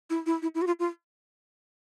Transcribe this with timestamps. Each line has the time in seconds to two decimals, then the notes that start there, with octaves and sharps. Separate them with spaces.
0.10 E4
0.26 E4
0.42 E4
0.55 E4
0.62 F#4
0.67 F4
0.79 F4